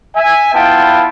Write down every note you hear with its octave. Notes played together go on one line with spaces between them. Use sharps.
E5 G#5
B3 E4 F4 G5 A5